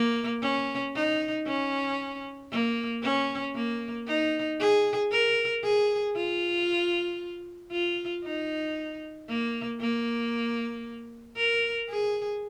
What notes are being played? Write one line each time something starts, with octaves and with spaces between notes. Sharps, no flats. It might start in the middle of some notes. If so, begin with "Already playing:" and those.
Already playing: A#3
C#4
D#4
C#4
A#3
C#4
A#3
D#4
G#4
A#4
G#4
F4
F4
D#4
A#3
A#3
A#4
G#4